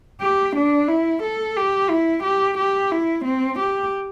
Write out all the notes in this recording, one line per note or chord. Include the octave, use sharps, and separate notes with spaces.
G4
D4
E4
A4
G4
E4
G4
G4
E4
C4
G4